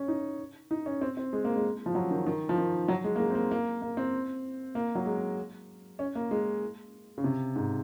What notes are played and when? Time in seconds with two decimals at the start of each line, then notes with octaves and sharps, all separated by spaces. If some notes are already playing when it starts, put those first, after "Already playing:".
Already playing: C#4
0.08 D#4
0.71 D#4
0.86 C#4
1.01 C4
1.17 C4
1.33 G#3
1.45 A#3
1.56 G#3
1.86 F3
1.95 F#3
2.11 D#3
2.26 D#3
2.49 F3
2.58 D#3
2.88 F#3
3.04 G#3
3.16 A#3
3.20 G#3
3.30 C4
3.35 A#3
3.51 A#3
3.82 A#3
3.97 C4
4.75 A#3
4.95 F#3
5.06 G#3
5.99 C#4
6.15 A#3
6.31 G#3
7.18 C#3
7.24 C3
7.56 G#2